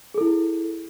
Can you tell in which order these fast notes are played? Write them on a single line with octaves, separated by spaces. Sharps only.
G#4 A4 E4